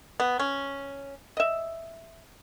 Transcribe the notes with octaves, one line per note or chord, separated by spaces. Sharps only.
B3
C#4
D#5 E5